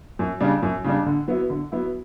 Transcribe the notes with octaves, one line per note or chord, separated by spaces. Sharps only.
F#2
C#3 G3 D4
F#2
C#3 G3 D4
D3
F#3 B3 E4
D3
F#3 B3 E4